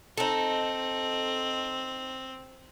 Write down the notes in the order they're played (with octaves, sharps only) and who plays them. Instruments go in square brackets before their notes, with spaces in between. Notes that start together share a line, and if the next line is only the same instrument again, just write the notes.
[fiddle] C4 [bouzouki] D#4 A4